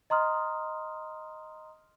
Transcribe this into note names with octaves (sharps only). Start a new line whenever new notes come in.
D#5 A#5 C6 D#6 F6